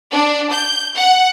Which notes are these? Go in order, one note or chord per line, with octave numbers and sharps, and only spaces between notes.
D4
G6
F#5